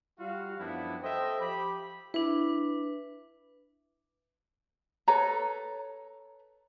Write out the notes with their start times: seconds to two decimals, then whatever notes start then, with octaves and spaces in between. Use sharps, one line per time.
0.19 G3 F4 F#4 F5
0.58 F#2 F3 G3 B3 D4 E4
1.02 A4 C5 D#5 E5 G5
1.39 F3 G4 B5
2.14 D4 E4 B4
5.08 A4 B4 C#5 A#5